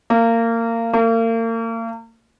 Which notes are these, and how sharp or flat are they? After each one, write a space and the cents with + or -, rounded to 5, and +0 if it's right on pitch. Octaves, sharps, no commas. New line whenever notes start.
A#3 -25
A#3 -40